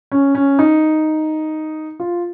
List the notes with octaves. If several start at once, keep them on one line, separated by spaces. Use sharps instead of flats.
C#4
C#4
D#4
F4